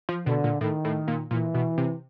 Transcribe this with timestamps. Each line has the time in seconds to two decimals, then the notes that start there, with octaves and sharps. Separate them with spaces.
0.09 F3
0.26 B2 D3
0.44 A#2
0.61 A2 D#3
0.85 A2
1.08 A#2
1.31 A#2 E3
1.54 B2
1.78 C3